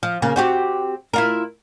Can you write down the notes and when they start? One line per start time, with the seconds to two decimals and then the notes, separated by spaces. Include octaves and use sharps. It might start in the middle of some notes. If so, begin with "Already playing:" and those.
0.03 F3
0.22 C#3 A#3
0.36 C4 F#4 G4
1.13 E4 F4 A#4